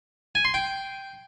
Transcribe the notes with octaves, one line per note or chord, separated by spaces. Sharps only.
G#5
C6
G5